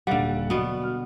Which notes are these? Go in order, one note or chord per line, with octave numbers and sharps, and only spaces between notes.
D#1 D3 G3 F5 F#5
B2 F#3 B3 D5
F6